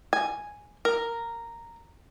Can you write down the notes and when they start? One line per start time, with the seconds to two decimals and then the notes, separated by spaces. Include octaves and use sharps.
0.13 G#5
0.85 A#4